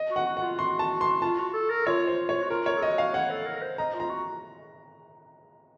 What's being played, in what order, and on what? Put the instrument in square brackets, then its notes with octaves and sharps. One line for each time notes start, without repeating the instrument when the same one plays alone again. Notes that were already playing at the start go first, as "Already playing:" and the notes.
Already playing: [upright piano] D#5
[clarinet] F#4
[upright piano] F#5
[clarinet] F#4
[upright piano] F#5
[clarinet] F4
[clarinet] F#4 [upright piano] C6
[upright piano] A5
C6
[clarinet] F4 [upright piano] A5
[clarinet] F#4
A4
A#4
[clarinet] F4 [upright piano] C#5
[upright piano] C5
C#5
[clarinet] F#4
[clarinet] F4 [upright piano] A#4
[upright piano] C#5
[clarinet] A4
[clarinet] F#4 [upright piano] D#5
[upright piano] F5
[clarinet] C#5 [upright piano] F#5
[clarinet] A4
A#4
A#4
C5
[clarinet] D#5 [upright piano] A#5
[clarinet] F4
[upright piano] A#5
[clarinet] F#4